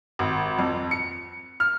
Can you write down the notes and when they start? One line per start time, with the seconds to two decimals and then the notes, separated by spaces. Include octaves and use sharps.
0.19 G#1
0.59 F2
0.91 C#7
1.60 F6